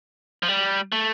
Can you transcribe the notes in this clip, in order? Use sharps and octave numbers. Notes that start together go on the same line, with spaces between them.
F3
G3
A3